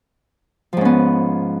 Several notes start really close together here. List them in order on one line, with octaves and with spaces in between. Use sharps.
F3 G#2 C#4 B3